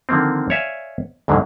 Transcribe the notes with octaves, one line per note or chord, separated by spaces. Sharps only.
D3 D#3 F3 A#3 C4
C#5 D5 E5 F5 G#5
D2 G#2 D3 D#3 F#3